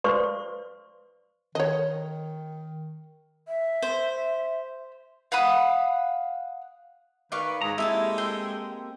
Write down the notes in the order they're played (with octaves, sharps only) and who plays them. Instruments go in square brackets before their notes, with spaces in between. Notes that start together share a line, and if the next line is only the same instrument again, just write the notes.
[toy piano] B4 C5 D5 F5 C6 C#6
[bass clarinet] D#3 [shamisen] C#5 D#5
[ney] E5
[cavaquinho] C5
[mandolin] F5 F#5 B5 D#6
[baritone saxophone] D#3 [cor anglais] B4 [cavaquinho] D5 F5 C#6
[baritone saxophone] G#2 [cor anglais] G#4 [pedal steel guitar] A#5
[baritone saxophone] G#3 [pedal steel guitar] A#3 C4 G4 [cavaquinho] E4 G#5 A5 [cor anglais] A4
[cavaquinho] G5 C6